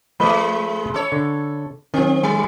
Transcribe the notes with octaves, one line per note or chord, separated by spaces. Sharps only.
F3 G#3 A3 B4 D#5 B5
A4 C#5
D3
D#3 F#3 C4
G3 G#5